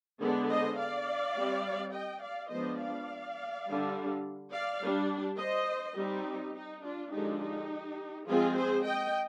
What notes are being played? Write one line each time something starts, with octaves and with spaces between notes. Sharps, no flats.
D3 G#3 B3 D4
C5 D#5
D5 F5
G3 C4
D#5 G5
D5 F5
F3 G#3 B3 D4 C5 D#5
D5 F5
D3 G3 D4
D5 F5
G3 D4
C5 D#5
G3 C4 D#4 G4
D#4
D4 F4
D3 F3 G#3 D4 D#4 G4
D#4 G4
F3 G#3 C4 F4 G#4
G#4 C5
D#5 G5